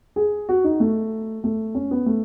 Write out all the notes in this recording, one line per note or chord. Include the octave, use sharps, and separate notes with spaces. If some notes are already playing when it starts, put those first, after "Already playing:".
G#4
F#4
D#4
A3
A3
C#4
B3
A3